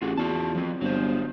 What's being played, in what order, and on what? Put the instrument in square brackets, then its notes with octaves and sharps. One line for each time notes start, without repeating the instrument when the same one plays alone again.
[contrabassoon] A1 [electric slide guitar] F4 F#4 G#4
[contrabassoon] E2 [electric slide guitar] F4 F#4 A5
[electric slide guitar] F3 C4
[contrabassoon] G1 [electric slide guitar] F#3 C5